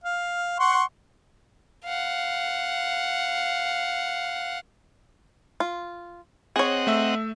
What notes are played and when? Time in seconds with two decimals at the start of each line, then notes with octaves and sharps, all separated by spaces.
0.04 F5
0.59 F#5 C6 C#6
1.85 F5 F#5
5.60 F4
6.56 C4 G#4 C#5 D#5 F#5
6.87 A3 E5 E6